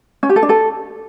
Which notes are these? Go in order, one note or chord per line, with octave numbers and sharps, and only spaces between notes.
C#4
G4
A4
D4
A4